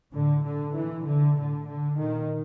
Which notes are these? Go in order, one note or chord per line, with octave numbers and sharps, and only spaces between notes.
A2 D3
D3
A#2 E3
D3
A2 D3
D3
A#2 D#3